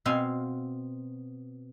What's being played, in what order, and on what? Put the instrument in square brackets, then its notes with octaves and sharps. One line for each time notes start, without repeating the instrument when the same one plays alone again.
[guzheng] B2 C4 F5 G#5